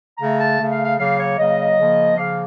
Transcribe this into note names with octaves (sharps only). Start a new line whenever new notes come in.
C#3 A3 A#5
A5
C#3 A3
F5
F5
C#3 F#3 A#3 F5
C#5
C#3 F#3 A#3 D#5
C#3 F3 A#3
C#3 F3 A#3 F5